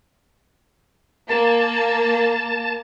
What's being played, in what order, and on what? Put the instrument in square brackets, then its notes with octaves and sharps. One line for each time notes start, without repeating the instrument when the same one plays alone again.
[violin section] A#3 [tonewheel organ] A5